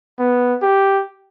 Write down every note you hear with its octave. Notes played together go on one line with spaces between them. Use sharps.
B3
G4